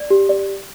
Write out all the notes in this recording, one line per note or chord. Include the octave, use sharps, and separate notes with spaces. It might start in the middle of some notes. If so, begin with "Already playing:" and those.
Already playing: D5
G4
D5